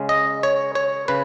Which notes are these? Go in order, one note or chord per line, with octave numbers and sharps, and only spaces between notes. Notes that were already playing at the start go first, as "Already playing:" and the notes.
Already playing: C#3 G#3 C#4
D#5
C#5
C#5
C#3 B4